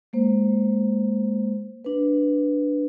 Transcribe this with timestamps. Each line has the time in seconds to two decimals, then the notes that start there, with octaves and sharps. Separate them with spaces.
0.13 G#3 A#3 C5
1.85 D4 B4